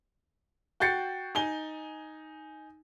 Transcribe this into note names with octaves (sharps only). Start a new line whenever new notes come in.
F#4 G5 G6 A6 C7 C#7
D#4 G#5 G7